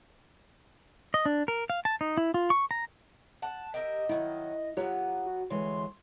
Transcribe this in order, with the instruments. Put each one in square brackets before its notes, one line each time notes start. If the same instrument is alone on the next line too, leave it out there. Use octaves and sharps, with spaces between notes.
[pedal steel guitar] D#5
D4
A#4
F5
A5
D#4
E4
F4
C#6
A#5
[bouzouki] F#5 [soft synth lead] A5
[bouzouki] G4 A#4 E5 [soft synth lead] D#5
[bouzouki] D#3 F#3 [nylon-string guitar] E4
[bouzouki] F#3 B3 [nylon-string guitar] F4 G4 C#5
[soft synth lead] F#4
[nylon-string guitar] D2 E3 G#3 [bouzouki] C#5 [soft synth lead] C6